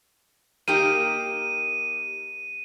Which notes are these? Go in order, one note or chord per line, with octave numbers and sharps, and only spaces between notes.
A#3 D#4 G4 D#7